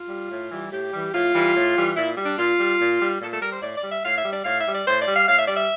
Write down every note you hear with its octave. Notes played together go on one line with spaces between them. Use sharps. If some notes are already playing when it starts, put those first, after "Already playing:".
Already playing: F4
G3
A2
E3 G3
A2 G4
E3 G3
A2 F4
E3 G3
A2
E3 G3
A#2 E4
G3
D4
A#2 F4
G3
A#2
G3
A#2 A4
A4
G3 A#4
C5
A2 D5
D5
G3
E5
A2 F5
E5
G3
D5
A2 F5
E5
G3
D5
A2 C5
D5
G3
F5
A2 F5
E5
G3 D5
E5